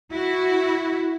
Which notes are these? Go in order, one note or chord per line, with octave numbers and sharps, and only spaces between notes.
E4 F#4